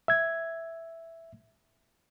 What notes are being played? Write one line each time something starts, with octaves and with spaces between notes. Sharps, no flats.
E5 G#6